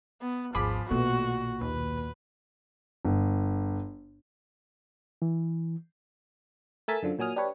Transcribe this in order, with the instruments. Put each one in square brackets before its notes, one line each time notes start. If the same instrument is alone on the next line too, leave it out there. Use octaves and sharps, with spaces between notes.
[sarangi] B3
[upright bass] G#1 D#2 [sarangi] F3 [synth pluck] G#4 B5 [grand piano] D6
[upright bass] B1 D#3 [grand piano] A#2 [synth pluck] A3 B3 [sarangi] F#4
[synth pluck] D#2 [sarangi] B4
[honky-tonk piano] G1
[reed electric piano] E3
[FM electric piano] A3 A#4 G#5 E6 A6 B6
F#2 D3 F3
A#2 F#3 G#5 D#6 F6
D4 G4 B4 C#5